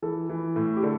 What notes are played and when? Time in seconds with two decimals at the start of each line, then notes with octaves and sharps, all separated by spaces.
0.02 E3 A4
0.29 E3
0.56 A2
0.77 G4
0.83 D3 A4